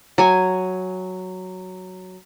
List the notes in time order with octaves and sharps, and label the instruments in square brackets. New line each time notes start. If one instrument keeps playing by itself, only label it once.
[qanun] F#3 G#5